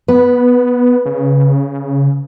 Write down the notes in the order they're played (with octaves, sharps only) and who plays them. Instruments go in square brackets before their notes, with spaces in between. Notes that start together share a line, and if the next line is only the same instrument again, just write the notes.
[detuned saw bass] B3 [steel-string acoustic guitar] B4
[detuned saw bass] C#3